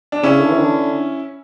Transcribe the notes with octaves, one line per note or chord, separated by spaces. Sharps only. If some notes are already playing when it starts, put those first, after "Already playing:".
D4
C#3 C#4 E4
D3
E3
D3